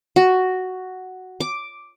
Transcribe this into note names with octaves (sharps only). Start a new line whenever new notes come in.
F#4
D6